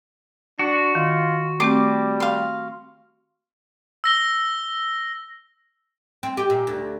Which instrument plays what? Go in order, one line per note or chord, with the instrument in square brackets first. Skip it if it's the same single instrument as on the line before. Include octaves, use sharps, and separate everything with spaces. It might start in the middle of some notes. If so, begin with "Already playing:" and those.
[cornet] D4 [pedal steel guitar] F#4
[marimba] D#3 [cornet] F4
[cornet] G3 [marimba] A3 C4 G4 [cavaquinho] D6
[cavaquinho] F5 C6
[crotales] E6 A#6 G7
[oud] C4
G4
A#2
D2